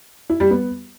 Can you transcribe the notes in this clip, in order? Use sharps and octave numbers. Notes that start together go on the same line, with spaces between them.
E4
G3
B3